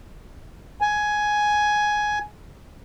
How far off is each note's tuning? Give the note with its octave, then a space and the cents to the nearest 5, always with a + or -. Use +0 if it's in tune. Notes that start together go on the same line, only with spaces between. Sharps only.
G#5 +10